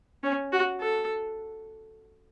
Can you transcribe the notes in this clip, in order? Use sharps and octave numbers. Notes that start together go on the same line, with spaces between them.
C#4
F#4
A4